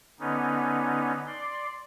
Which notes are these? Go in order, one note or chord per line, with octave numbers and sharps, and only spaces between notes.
D3 B3 C#4 D#4
D5 C6